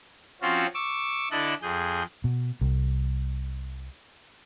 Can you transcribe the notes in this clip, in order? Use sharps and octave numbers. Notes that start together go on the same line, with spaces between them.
F3 C4 C#4 F4 F#4
C#6 D6 E6
D3 D4 E4 A4 D#5 F#6
F2 G#4 G6
B2
C2